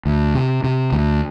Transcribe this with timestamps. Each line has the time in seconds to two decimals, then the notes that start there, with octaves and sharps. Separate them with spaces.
0.06 D2
0.35 C3
0.64 C3
0.92 D2